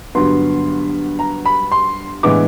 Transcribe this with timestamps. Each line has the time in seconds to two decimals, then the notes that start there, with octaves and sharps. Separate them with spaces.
0.15 G2 D3 F#3 B3 C6
1.19 A#5
1.46 B5
1.72 C6
2.23 A2 E3 G#3 B3 D4 D6